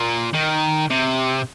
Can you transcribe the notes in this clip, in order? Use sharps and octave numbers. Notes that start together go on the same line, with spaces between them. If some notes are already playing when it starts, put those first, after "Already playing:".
Already playing: A#2
D#3
C3